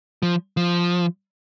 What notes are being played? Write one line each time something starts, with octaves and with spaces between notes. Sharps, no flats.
F3
F3